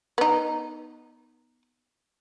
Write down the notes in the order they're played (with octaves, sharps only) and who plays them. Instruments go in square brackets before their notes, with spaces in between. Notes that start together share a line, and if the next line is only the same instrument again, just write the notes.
[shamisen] B3 D#4